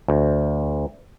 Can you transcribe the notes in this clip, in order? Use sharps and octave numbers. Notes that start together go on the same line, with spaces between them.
D2